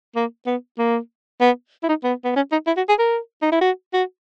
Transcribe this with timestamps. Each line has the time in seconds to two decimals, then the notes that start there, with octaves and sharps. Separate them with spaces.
0.16 A#3
0.47 B3
0.79 A#3
1.41 B3
1.83 E4
1.89 D#4
2.04 B3
2.24 B3
2.36 C#4
2.52 D#4
2.67 E4
2.77 F#4
2.89 G#4
2.99 A#4
3.42 D#4
3.52 E4
3.61 F#4
3.94 F#4